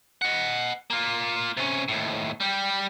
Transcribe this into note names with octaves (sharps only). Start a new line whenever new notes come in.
D#5 F#5
A#3 F4
C3 C#4
D#2 A2
G3 G4